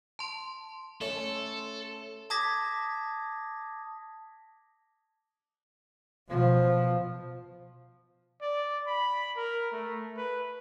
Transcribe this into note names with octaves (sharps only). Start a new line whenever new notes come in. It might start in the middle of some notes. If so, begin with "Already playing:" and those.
A5 C6
A3 C#4 A4
A5 D6 D#6 G#6 A#6 B6
B2 F3
D5
B5
A#4
A3
B4